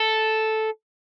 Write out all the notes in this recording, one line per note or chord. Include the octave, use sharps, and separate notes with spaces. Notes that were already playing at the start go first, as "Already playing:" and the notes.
Already playing: A4